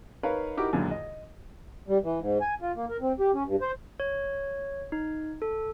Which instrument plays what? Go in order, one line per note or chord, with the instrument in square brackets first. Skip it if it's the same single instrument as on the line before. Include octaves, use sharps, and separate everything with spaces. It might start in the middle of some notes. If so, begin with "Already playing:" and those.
[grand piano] D#4 A#4 B4 C#5 F5
D#4 E4 F#4 G4 A#4 D6
C#2 F#2 A#2 D3 D#3
D#5
[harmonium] G3
E3
G#2
G#5
F4
A#3
A#4
C4
G4
C#4
G2
C5
[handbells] C#5
D#4
A4